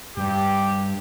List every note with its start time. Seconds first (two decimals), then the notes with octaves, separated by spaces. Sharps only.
0.17 G2 G4